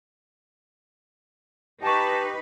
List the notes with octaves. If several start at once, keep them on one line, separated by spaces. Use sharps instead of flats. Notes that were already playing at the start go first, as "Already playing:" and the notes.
D#4 G4 B4 G#5 A5 C#6